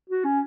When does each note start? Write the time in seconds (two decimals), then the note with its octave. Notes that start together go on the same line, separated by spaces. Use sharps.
0.09 F#4
0.24 C#4